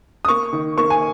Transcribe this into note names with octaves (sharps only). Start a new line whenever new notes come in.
D#6
A#3 C#6
D#3
A#3 C#6
G#5